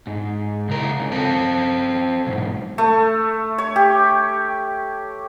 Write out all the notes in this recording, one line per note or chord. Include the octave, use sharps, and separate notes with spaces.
G#2
C#2 A#4
C#2
C4 A4
B1 G#2
A3
C#5
G4